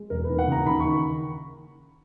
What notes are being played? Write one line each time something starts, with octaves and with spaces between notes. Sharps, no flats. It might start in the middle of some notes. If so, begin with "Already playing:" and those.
Already playing: G#3
E1 A#4
B4
D#2
F#5
C#3 A#5
D#2 B5
C#6
D#3